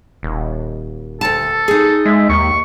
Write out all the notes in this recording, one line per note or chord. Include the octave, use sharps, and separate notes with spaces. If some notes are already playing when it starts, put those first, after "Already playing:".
D#1
D2 A4 A5
D#4 G#4
G#3 E5
D#2 C#6